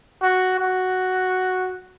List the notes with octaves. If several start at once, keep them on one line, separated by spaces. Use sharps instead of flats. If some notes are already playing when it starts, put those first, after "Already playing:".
F#4
F#4